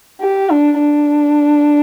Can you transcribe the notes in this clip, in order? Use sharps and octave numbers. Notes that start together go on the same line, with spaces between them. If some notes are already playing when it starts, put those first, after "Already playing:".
G4
D4
D4